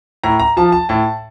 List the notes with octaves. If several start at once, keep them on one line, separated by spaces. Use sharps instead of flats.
A2 A#5
A#5
F3 A5
A5
A2 A5